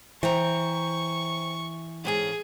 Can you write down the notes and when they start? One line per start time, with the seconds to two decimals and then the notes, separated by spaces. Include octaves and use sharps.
0.23 E3 C5 G5 A#5 C#6
2.05 G#2 C#4 G#4 A4